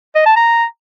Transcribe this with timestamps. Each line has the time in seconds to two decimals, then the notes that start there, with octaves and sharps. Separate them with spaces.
0.15 D#5
0.26 A5
0.36 A#5